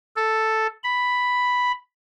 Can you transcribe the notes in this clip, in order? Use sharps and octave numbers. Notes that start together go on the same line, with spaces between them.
A4
B5